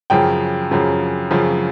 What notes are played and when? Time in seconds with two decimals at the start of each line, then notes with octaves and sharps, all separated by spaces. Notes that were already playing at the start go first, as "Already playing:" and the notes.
0.10 F#2 C#3 F3 G5
0.71 F#2 C#3 F3
1.31 F#2 C#3 F3